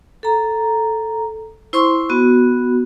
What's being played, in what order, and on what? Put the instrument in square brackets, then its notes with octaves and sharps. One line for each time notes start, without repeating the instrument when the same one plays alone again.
[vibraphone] A4 A#5
E4 C5 C6 C#6 E6
B3 F#4